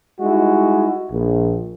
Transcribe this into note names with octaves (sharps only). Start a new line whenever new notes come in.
G3 G#3 D#4 E4 F#4
A#1